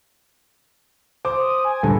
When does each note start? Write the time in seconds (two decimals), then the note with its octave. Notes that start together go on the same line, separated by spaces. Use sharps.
1.25 C5 D6
1.39 D#6
1.65 G#5
1.83 D2 G2 A#2 D3 A4